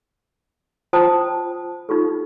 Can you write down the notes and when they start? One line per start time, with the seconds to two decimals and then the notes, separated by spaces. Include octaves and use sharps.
0.93 F4 C5 G5 A5 A#5 D#6
1.89 D#4 F4 G4 A4